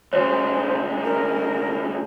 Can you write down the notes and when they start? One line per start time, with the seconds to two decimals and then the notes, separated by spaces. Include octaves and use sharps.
0.13 D2 C#3 C5 C#5
1.04 A#4